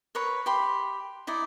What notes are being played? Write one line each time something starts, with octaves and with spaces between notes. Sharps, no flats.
A#4 B4 C#5
G4 B5 C6
D#4 E4 D5 D#5